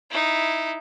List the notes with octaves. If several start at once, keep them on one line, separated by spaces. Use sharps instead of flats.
D#4 E4